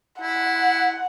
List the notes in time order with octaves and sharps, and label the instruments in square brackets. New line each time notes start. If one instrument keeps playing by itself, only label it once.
[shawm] E4 [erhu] F#5